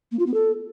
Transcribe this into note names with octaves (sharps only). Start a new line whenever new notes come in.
A#3
F4
B3
A4